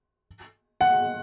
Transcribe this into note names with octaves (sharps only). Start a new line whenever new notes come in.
F#5